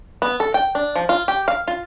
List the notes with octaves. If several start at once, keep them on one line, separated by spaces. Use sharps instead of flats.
B3
A4
G5
D4
F3
F4
G4
F5
F4